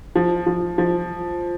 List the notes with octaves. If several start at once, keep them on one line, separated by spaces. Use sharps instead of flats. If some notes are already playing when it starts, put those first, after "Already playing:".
F3
F3
F3